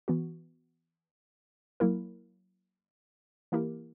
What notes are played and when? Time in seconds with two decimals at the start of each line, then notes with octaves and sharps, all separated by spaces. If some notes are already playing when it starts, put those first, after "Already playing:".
0.08 E3 B3 F#4
1.80 F#3 A#3 E4 A#4
3.52 E3 A#3 E4 G4 A#4